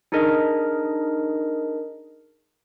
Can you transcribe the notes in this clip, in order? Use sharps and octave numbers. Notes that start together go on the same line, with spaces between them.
D4 D#4 G#4 A#4 D#5